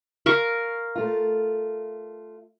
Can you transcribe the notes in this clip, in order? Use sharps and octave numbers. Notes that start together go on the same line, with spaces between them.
A#4 F5 C#6
A3 F4